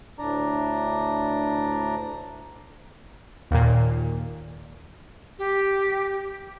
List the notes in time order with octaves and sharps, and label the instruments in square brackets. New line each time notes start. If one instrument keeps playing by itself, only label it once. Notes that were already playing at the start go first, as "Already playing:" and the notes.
[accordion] D2 A2 D4 D5 A#5
[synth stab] D#2 A#2
[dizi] G4